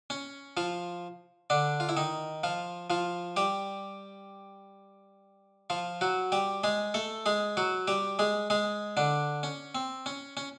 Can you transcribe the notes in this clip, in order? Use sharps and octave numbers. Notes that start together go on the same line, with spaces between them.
C#4
F3 F4
D3 D4
F4
E4
D#3 D#4
F3 F4
F3 F4
G3 G4
F3 F4
F#3 F#4
G3 G4
G#3 G#4
A3 A4
G#3 G#4
F#3 F#4
G3 G4
G#3 G#4
G#3 G#4
D3 D4
C#4
C4
C#4
C#4